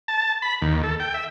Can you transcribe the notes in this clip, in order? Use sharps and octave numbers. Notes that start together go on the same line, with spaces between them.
A5
B5
D#2
A4
G5
E5